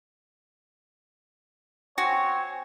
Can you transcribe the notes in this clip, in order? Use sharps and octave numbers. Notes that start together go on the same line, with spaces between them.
C4 F#4 C#5 G#5